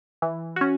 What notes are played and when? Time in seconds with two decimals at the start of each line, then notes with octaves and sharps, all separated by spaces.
0.22 E3
0.56 C#4 F#4